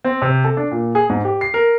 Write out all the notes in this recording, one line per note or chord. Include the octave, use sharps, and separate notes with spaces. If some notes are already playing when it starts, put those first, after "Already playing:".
C4
C3
A4
D4
A#2
G#4
G#2
G4
C7
A#4